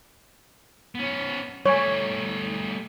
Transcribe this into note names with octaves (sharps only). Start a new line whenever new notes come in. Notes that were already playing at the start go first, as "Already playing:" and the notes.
B3 C#4
G3 A3 C#5 G#5